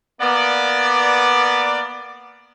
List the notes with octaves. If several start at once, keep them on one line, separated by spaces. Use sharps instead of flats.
A#3 B3 D5